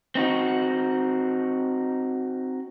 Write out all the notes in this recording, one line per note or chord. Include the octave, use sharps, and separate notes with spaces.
C4 D#4 F#4